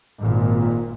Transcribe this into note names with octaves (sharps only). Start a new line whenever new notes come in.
G#1 A#2